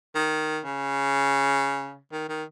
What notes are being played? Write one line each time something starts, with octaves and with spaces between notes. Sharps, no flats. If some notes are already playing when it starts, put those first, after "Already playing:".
D#3
C#3
D#3
D#3